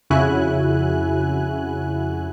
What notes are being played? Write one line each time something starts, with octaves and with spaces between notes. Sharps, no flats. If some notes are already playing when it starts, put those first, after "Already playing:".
F2 C#3 E4 F#4 G#5 F#6